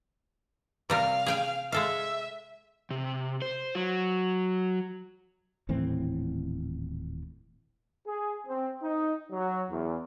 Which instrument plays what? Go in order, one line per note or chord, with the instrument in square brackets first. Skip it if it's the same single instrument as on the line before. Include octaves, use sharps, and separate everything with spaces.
[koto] C3 G3 A#4 [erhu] F5
[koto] G#4 G5 G#5
[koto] G#3 A4 F5 [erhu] E5
[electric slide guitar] C3
C5
F#3
[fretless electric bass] D#1 A2 E3 C4
[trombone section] G#4
C4
D#4
F#3
E2